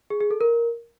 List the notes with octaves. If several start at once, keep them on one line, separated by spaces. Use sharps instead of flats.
G#4
G#4
A4
A#4